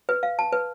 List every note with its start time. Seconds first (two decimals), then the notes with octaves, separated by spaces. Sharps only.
0.09 B4
0.23 F5
0.39 A5
0.53 B4